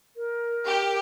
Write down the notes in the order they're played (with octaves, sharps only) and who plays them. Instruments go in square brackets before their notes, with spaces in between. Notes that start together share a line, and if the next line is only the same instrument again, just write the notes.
[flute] A#4
[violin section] G4